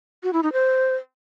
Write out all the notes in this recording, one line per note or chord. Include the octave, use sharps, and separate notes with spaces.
F#4
E4
D#4
C5